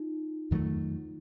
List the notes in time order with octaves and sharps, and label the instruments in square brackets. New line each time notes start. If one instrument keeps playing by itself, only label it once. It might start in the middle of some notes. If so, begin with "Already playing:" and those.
Already playing: [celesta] D#4 F4
[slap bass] F2 D#3 F#3 A3